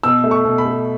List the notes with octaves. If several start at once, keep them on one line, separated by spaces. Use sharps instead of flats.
B2 E6
A3
C#6
B2
B5
A3